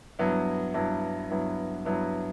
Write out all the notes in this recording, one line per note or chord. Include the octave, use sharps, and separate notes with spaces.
G2 F#3 B3 E4
G2 F#3 B3 E4
G2 F#3 B3 E4
G2 F#3 B3 E4